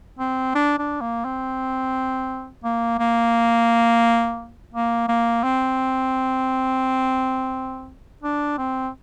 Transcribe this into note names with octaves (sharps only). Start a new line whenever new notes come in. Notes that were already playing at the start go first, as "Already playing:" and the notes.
C4
D4
D4
A#3
C4
A#3
A#3
A#3
A#3
C4
D4
C4